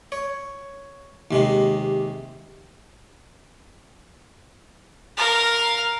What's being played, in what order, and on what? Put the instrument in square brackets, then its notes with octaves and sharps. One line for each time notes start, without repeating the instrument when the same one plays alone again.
[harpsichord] C#5
D#2 C3 G#3
[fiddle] A#4 F5